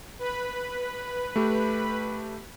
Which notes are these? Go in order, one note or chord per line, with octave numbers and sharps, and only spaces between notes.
B4 B5
A3 G4